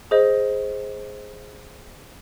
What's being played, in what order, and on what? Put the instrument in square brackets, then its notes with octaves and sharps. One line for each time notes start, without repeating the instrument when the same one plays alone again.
[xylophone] G#4 C5 D#5